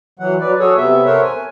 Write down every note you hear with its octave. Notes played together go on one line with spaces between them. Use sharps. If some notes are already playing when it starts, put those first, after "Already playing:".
E3 F#3 F#5
F#3 B4 D5
F#4 G#4 A4 C#5
C3 B3 E5
A4 A#4 C5 C#5 E5 F#5
G#5